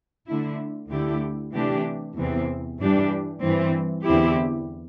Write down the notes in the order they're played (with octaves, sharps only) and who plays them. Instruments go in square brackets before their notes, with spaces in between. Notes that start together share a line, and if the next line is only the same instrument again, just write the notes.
[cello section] D3 A3 E4
D2 D3 A3 E4 G4
C3 E3 A3 D4 G4
E2 C3 E3 C4
G2 E3 G3 D4 G4
G2 E3 C4
E2 D3 C4 E4 G4